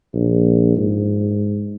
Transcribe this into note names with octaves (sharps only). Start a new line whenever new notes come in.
A#1
G#2